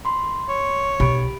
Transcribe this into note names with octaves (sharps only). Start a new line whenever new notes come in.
B5 C6
C#5
B1 G4 B5 D7